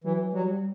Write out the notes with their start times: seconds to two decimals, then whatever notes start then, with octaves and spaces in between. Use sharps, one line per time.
0.04 E3 F#3
0.33 F#3 G3